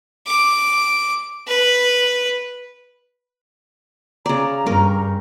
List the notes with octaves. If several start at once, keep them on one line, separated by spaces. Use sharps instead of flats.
D6
B4
C#3 D5 A#5
G2 C#4 A#4